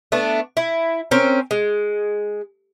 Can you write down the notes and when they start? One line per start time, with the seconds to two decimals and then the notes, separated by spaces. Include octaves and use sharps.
0.12 A3 B3 D4
0.57 E4
1.11 C4 C#4 A#4
1.51 G#3